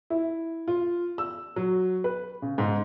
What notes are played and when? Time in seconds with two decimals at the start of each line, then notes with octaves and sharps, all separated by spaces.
0.10 E4
0.68 F4
1.18 E6
1.56 F#3
2.04 B4
2.42 C#3
2.58 G#2